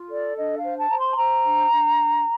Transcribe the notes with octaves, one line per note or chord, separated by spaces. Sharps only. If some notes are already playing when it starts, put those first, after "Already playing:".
Already playing: F4
A4 D5
D4 D#5
F5
C5
A5
C5 A#5
C6
A5
C5 A#5
D4
D4